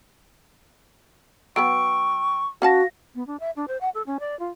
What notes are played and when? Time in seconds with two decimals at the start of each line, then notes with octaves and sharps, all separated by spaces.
1.56 F#3 B3 B4 G5 C#6 E6 D7
2.62 C#4 F#4 F5 F#5 A5 A#6
3.15 B3
3.27 D4
3.40 E5
3.56 D4
3.68 C5
3.81 F#5
3.95 A4
4.07 C#4
4.20 D5
4.39 F4